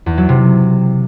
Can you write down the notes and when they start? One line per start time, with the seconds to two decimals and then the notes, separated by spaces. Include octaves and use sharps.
0.06 E2
0.17 F#3
0.29 C3